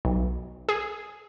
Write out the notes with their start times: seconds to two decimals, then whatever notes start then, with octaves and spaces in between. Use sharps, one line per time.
0.05 B1
0.69 G#4